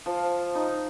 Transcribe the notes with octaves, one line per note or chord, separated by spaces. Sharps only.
F3
D#4